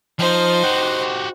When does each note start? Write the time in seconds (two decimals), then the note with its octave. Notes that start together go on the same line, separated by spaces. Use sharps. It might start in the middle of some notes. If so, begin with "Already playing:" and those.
0.19 F3 D#4 C5
0.63 F#4 G4